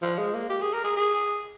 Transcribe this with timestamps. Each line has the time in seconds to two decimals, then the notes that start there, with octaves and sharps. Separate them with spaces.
0.02 F3
0.19 G#3
0.34 A#3
0.50 G4
0.61 G#4
0.73 A#4
0.84 G#4
0.97 G#4